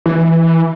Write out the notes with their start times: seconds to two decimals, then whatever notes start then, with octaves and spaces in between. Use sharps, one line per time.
0.06 E3